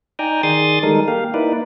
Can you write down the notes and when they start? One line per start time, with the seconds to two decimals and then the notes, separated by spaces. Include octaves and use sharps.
0.19 D#4 D5 G5 G#5 A#5
0.43 D#3 G#4 D5 C6 D#6 A6
0.83 D#3 G3 G#3 D#4 A4 A#4
1.08 A#3 G4 F5
1.34 A#3 D#4 E4 B4 D5